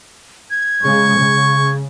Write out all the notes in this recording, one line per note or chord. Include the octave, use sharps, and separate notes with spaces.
G#6
C#3 G#3 C#6
C#3